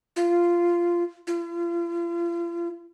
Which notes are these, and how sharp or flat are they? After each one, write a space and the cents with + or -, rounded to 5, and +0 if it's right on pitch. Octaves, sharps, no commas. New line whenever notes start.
F4 -10
F4 -40